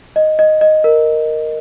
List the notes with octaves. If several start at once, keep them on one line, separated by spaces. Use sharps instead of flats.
D#5
D#5
D#5
A#4